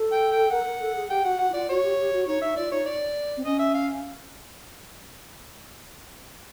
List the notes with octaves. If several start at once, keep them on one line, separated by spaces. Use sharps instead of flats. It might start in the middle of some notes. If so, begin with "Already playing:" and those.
Already playing: A4
G5
G5
A#4 F#5
A#4
A4
G#4
G4 G5
F#4 F#5
F#4 F#5
E4
F4 D5
F#4 C#5
G4
G4
F#4
D#4 C#5
D#4 E5
F4 D5
D#4 C#5
D5
C4
C#4 D#5
E5
F5